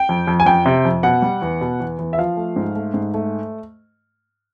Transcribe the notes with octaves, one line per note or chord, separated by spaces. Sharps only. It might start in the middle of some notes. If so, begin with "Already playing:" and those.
Already playing: G5
F2
F2
G#5
F2 G5
C3
F2
B2 F#5
G3
E2
B2
E2
E2
E5
F3 F5
A3
G#2
A3
G#2
A3